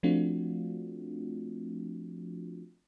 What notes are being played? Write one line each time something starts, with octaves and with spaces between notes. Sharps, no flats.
F3 A3 C4 D4 F4 F#4